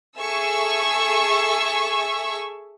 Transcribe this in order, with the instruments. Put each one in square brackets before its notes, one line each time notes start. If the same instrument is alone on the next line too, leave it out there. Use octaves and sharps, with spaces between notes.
[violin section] G#4 A4 E5 C#6 E6